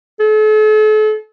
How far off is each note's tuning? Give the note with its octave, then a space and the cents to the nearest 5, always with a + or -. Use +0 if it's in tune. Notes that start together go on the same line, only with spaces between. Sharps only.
A4 -40